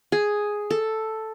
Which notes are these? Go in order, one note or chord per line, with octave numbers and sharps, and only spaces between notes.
G#4
A4